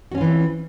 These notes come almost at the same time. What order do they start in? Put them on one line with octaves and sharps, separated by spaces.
F#4 C#4 F4 E3 C4